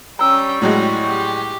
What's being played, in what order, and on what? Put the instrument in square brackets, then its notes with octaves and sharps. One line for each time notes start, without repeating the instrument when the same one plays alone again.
[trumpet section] G3 C#6 [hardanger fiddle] C#4 G5 [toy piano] A#5 E6
[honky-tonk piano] A2 F#3 G#3 [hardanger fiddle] F#4
[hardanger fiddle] G4